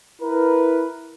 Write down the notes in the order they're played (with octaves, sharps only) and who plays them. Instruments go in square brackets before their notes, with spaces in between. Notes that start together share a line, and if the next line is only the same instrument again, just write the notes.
[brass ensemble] E4 A#4 B4